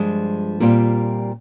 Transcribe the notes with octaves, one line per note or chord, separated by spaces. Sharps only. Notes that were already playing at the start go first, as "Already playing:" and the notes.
Already playing: G2 F3 G#3
A#2 G3 C4 F4